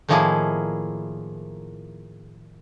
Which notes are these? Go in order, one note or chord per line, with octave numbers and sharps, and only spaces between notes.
A2 D#3 F3 A#3 E4 G#4